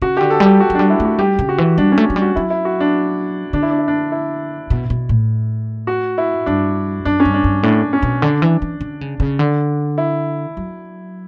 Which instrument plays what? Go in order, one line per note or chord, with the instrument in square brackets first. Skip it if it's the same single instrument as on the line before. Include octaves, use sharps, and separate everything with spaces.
[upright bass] C#3 [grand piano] F#4
[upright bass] D3 [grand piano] G4
[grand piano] A4
[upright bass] G3
[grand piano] G4
F#4
[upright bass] F#3
[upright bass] G3 [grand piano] D4
[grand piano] E4
[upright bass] A3 [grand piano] F#4
[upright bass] G3 [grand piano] G4
[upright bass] C#3
[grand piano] F#4
[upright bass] E3
[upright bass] G3 [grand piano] D4
[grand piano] C#4
[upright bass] A3
F#3
G3
[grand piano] F#4
[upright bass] F#3 [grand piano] E4
[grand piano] E4
F#4
D4
[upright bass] D3 [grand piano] D4
[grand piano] E4
D4
E4
D4
E4
[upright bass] B2
B2
A2
[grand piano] F#4
E4
[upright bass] G2 [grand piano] D4
[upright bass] F#2 [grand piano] D4
[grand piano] C#4
[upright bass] G2
[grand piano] D4
[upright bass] G2
[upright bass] A2 [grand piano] D4
[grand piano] C#4
[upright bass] B2
[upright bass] D3 [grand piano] D4
[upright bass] E3
E3
D3
C#3
C#3
D3
[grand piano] E4
[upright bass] F#3